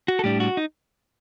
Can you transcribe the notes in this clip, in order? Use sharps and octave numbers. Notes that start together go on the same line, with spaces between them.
F#4
A4
A2 G3 D4 G4
F#4
D#4